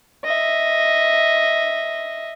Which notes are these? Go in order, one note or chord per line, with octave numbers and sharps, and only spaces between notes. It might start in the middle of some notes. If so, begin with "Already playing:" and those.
D#5 E5